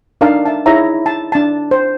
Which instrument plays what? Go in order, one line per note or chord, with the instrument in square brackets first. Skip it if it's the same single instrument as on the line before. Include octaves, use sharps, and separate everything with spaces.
[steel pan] D4 D#4 A#4 D5 F5 A5
E5 A5
D#4 E4 G#4 C#5 E5 A#5
A5
D4 A5
C5